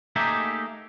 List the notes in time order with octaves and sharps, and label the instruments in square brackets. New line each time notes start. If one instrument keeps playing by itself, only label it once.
[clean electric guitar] A3 A#3 D#4 G4 G#4 E5